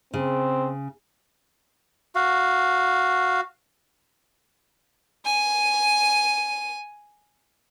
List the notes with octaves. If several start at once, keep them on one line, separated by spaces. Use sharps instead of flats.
C#3 C4
F#4 F5
G#5 D#7